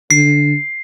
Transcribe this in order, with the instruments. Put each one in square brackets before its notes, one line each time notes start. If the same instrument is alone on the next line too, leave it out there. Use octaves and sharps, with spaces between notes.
[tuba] D3 [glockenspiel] C7